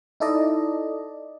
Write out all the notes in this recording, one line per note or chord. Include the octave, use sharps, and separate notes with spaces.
D#4 E4 A4 D5 D#5